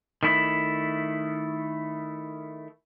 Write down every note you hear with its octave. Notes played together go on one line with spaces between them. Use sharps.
D#3 A3 E4